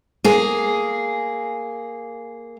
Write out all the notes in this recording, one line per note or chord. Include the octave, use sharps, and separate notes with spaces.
A#3 G#4